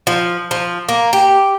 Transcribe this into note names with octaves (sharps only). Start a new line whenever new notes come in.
F3
F3
A#3
G4